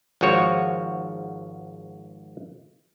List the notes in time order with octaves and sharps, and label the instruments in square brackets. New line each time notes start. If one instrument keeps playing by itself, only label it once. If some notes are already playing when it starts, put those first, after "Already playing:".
[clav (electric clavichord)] G#1 G#2 F3 F#4 C#5